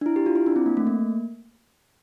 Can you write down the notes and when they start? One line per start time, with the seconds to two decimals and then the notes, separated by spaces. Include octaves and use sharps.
0.01 D4
0.06 E4
0.16 G4
0.26 F4
0.36 E4
0.46 D4
0.56 C4
0.66 A#3
0.77 A3
0.87 A#3